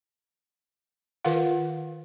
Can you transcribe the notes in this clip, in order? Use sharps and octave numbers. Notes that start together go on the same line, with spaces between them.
D#3 F4 A#4 B4 F5 F#5